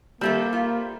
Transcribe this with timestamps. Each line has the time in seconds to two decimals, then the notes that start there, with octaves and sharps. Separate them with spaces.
0.21 D#3 G3 A3 A#3 C4
0.53 F4